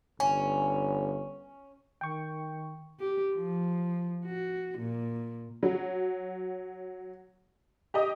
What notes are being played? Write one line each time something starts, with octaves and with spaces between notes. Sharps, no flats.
G1 C#4 G#5
D#3 G5 C#6
G4
F3
F#4
A#2
F#3
G4 D#5